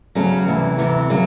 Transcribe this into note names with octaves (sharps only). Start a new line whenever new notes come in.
D2 C#3 F#3 A3 C#4
D2 C3 E3
D2 C3 E3
C#3 F#3 A#3